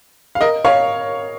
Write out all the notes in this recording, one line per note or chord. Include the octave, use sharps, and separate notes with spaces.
F5
A#4 D#5
C#5 F5